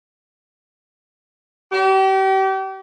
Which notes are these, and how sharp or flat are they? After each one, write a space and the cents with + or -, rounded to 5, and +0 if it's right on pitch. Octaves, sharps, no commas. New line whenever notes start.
G4 -35